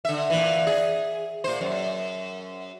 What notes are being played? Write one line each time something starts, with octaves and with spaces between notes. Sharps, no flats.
D3 E5
A#2 E3
G#4
A#2 C5
F#2